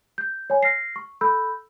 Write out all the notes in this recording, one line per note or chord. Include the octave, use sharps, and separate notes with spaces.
G6
C#5 G#5
F6 A#6 C7
C#6
A4 B5 E6 G6